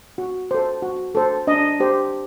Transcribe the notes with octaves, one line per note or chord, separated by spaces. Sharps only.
F#4
A4 C5
F#4
A4 C5
D4 D#5
G4 C5